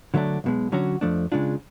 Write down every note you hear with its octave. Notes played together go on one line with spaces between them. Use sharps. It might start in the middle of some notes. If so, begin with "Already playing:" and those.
D3 F#3 A3 D4
B1 B2 G#3
D3 F#3 C#4 F#4
F2 F3 A3 D4
C#3 G#3 D4 F4